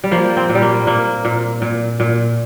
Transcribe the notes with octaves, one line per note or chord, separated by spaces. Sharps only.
G3
F3 A#3
C4
A#2
G3
A#3
A#2 A#3
A#2
A#2
A#2